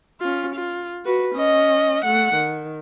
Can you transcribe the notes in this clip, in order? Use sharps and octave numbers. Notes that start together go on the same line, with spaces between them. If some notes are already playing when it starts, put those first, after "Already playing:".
C#4 F4
F4
F#4 B4
C#4 D#5
A3 F#5
D#3